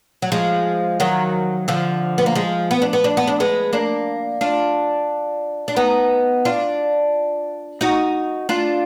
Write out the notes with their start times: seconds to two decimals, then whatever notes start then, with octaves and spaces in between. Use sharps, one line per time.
0.22 F#3
0.32 F3 G#3
1.00 D#3 F#3
1.68 D3 F3
2.18 B3
2.26 A#3
2.35 F3 G#3
2.71 B3
2.82 D4
2.93 B3
3.04 D4
3.17 B3
3.27 D4
3.40 G#3 B3
3.73 A#3 D4
4.41 D4 F4
5.68 D4
5.76 B3 D#4
6.45 D4 F4
7.81 D#4 F#4
8.49 D4 F4